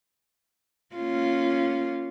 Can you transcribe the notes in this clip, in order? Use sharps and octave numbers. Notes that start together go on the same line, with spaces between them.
A#3 C#4 F4